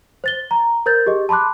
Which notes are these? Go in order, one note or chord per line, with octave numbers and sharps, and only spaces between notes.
C5 A6 G7
A#5
A#4 C5 G6 A6
G4 G#4 D#5
A5 B5 C6 D6 F#6